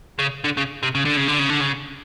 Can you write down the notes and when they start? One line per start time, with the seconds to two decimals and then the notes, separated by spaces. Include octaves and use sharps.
0.19 C#3
0.44 D3
0.57 C#3
0.83 C3
0.95 C#3
1.05 D3
1.17 C#3
1.28 D3
1.39 C#3
1.49 D3
1.61 C#3